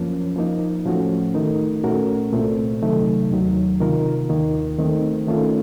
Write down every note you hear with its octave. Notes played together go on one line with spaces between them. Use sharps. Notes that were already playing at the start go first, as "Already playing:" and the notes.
Already playing: F#2 F3 A#3 C#4
F3 A#3 D#4
A2 F3 A3 C#4 F#4
D#3 A3 D#4 A#4
A#2 A3 C#4 F#4 A#4
C2 A#2 A3 C4
C3 D#3 F#3 A3 D#4
D#2 D#3 F#3
C3 D#3 A#3 F4 A#4
D#2 D#3 A#3
D#3 A3 C4
D#3 A3 C#4 F4